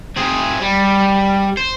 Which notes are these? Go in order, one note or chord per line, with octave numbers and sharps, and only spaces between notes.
C4 G#4
G3
C5